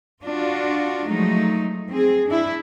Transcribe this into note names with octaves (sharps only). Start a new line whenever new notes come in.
D4 F4 F#4
F3 F#3 G#3 A3 D#4
C4 G#4
D4 E4